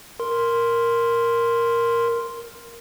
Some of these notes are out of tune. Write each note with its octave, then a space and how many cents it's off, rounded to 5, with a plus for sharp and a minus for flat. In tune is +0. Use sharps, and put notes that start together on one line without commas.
A#4 +0 C6 +0